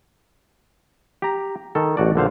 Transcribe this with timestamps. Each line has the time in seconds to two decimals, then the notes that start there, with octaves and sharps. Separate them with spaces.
1.22 G4 A#5
1.75 D#3 A4
1.97 A1 F#4 D5
2.15 A#1 D3 C5 F5